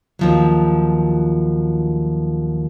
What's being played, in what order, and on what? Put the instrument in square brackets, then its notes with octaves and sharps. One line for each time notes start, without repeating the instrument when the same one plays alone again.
[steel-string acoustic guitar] D#2 F3 F#3